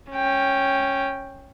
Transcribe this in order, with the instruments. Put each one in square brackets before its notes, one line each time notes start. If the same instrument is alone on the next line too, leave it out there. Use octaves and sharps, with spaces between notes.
[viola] C#4 G5